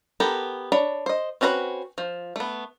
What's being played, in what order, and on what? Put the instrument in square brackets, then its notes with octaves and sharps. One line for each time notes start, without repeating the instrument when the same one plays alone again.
[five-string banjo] B3 G4 A4 A#4
D4 C#5 B5
C5 D#5
C4 C#4 F#4 A4 B4
F3
A3 B3